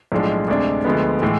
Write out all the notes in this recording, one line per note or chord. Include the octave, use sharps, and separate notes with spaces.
B1 A2 F3 G#3 D4
D2 C3 G#3 D4
D2 D3 F3 G#3 B3
A2 E3 G#3